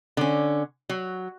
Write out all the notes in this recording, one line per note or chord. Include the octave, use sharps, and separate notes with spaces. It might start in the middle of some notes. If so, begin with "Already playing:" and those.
D3 C#4
F#3